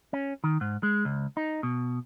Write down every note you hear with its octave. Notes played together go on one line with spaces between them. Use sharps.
C#4
D#3
G#2
G#3
C#2
D#4
B2